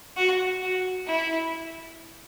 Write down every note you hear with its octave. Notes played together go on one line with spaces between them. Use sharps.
F#4
F#4
E4